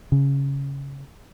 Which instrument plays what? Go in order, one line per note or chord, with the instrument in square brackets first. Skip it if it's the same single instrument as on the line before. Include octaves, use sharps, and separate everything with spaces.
[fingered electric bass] C#3